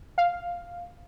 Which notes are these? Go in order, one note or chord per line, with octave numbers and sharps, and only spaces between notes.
F5